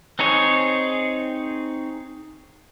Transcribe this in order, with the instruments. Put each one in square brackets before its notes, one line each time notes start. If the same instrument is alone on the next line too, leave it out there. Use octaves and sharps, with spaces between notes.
[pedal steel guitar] C4 D#4 G#4 C#5